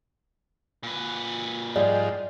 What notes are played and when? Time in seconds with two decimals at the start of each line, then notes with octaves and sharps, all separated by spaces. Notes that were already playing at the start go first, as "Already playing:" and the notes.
0.83 A#2 B4
1.76 G#2 F3 G3 G#3 D5